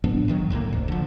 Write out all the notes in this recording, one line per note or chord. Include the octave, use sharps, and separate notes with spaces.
A2 F#3 B3 D4
G#1 D#3 F#3
D2 A2 C3 A#3
F1 D2
D3 F3